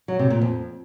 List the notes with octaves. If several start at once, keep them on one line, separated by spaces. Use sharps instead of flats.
F#3
C3
A#2
F2